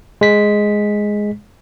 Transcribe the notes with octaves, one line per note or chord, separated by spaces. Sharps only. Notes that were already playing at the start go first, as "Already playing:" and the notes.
G#3 B6